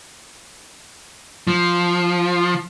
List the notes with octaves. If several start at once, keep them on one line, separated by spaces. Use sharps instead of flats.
F3